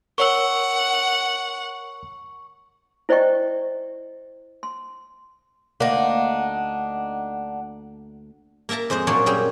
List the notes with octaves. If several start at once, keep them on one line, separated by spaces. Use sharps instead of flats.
A#4 C#5 F#5 C#6 E6
E4 C5 D5 D#5 G5 C#6
C6
D2 A#3 D4 D#4 F#5
A#3 A#4 E5 A5 A#5
F2 G#3 C5 D#5
A#2 F#3 D4 C#5 D5 C6
F#2 G3 G#4 G5 C6